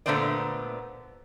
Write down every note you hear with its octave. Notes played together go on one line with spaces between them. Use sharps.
A#2 D3 A3 B3 C5 D5